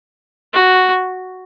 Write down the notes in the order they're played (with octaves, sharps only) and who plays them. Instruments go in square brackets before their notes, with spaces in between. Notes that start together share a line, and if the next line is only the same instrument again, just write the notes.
[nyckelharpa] F#4